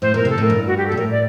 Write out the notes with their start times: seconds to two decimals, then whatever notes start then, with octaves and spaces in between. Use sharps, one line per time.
0.02 A2 C5
0.14 A#2 A#4
0.25 C3 A4
0.38 A2
0.44 A#4
0.50 G2
0.67 F#4
0.77 G4
0.87 A#2 A4
0.97 A2 A#4
1.11 D5